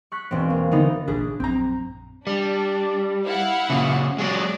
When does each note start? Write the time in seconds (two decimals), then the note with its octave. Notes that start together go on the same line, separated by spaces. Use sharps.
0.12 C#6 F#6 B6
0.31 E1 C4
0.50 A#3
0.71 D3 E3 B3 D#4
1.08 A1 A#2 D4 G#4
1.40 A#1 F#2 C4 A#5
2.27 G3 D4
3.26 E4 F5 F#5
3.70 A#2 C#3
4.18 F#3 G#3 D5